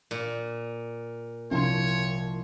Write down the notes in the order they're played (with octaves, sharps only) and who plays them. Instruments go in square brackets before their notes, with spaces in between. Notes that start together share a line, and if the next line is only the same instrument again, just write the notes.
[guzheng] A#2
[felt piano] C2 C6 [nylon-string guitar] F3 F4 [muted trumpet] C#5